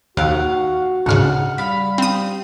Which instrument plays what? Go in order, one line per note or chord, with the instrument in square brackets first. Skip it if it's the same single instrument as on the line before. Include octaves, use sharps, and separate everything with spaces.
[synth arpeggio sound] D#2 [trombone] F#4 [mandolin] F5 F#5
[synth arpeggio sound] D2 G#2 C#3 [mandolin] F#5 F6
[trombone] G3 [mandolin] F5 B5
[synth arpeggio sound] C4 D#6